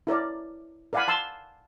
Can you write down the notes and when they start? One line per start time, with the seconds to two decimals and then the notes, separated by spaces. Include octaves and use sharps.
0.07 E4 A#4 C#5 D5
0.93 A#4 D5 F5 F#5 G#5 B5
1.08 A5 C6 E6